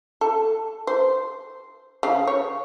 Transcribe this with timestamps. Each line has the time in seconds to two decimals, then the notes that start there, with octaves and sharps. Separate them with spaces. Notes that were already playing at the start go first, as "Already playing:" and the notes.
0.21 A4
0.87 C5
2.03 C#3 F5
2.27 C#5